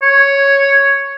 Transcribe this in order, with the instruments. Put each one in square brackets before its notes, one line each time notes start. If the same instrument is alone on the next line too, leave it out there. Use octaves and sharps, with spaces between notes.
[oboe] C#5